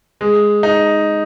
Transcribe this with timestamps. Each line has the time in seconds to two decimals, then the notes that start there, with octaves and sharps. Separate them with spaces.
0.21 G#3
0.63 D#4